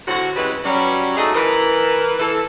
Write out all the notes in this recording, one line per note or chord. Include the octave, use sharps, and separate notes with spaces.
A2 D3 C4 F#4
C#3 E3 G#3 G4 B4
F#3 G3 C#4
A3 D#4 F#4 G#4 A4 D#5
E3 A#4 B4
E3 A4